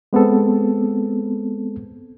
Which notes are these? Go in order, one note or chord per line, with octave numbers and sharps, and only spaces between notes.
G#3 B3 C4 A4